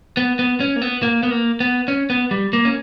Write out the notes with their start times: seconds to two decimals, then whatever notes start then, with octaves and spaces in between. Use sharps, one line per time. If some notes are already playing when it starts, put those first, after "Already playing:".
0.17 B3
0.39 B3
0.60 C#4
0.76 A#3
0.82 B3
1.03 A#3
1.23 B3
1.31 A#3
1.60 B3
1.88 C#4
2.10 B3
2.31 G3
2.53 A#3
2.65 C#4